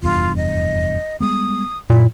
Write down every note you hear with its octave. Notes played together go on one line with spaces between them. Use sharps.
F1 E2 G2 F4
D#5
G3 G#3 B3 D#6
F#2 A#2 E4